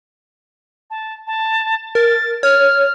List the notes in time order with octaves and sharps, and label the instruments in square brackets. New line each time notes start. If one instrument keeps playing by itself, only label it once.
[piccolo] A5
A5
[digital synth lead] A#4 [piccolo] A6
[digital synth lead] C#5 [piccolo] F6